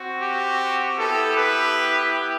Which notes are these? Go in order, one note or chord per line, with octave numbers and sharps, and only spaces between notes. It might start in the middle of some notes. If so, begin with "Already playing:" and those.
Already playing: C4 F#4
G4
B3 E4 G4 A4
B4